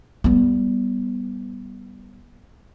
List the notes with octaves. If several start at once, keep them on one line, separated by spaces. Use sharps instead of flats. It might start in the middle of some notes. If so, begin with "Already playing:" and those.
G3 B3